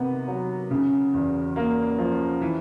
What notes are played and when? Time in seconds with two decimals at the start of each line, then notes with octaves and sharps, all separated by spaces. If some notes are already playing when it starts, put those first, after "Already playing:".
Already playing: C3 D#3 B3
0.28 F#3
0.71 C#3
1.14 E2
1.56 A#3
1.98 F3
2.41 E3